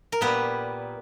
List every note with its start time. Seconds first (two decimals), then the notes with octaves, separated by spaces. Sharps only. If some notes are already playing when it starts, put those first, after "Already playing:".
0.12 A#4
0.21 A#2 G3 A#3 B3 B4